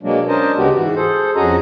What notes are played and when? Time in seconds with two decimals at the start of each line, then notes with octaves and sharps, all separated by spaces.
0.03 B2 F#3 G#3 A#3 D4
0.28 C#4 D4 A#4 C5 D#5 A5
0.57 D2 C#3 G#3 B3 F#4 G4
0.75 G#2 E3 F#4
0.96 G#4 A4 C5
1.36 F2 C#4 F#4 G#4 D#5 A#5